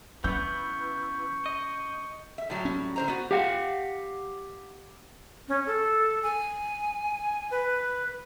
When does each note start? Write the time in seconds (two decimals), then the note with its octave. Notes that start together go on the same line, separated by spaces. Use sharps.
0.24 E3 B3 C#4 C#6 G6
1.46 D#5
2.38 E5
2.50 A2 F#3 G3
2.65 C#4
2.96 D3 C5 A#5
3.08 B3 F#4
3.31 G4 F5 F#5
5.48 C#4
5.66 A4
6.23 G#5
7.51 B4